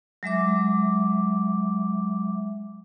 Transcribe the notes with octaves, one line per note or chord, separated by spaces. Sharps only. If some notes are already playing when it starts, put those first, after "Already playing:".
F#3 G#3 E5 D6